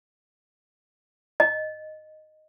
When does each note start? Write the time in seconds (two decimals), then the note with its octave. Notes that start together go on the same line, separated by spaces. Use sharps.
1.40 D#5